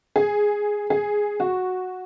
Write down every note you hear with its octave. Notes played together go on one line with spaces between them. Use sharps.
G#4
G#4
F#4